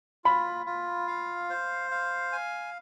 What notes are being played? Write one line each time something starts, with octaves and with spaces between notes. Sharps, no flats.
F4 B5
F4
F5
C5
F5
G#5